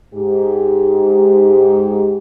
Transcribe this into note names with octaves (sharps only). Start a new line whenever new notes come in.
G#2 G4